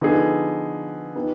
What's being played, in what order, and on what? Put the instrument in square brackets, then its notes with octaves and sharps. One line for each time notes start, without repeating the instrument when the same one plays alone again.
[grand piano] D3 F3 B3 D#4 G#4
F3 B3 D#4 G4